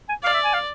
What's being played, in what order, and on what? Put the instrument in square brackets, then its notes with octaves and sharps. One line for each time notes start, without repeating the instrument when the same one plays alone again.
[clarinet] G#5
[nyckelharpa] D5 [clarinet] F5
[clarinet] E5
G#5
F5